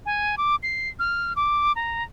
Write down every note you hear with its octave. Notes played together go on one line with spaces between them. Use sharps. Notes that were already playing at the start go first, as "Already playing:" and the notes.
G#5
D6
C7
F6
D6
A#5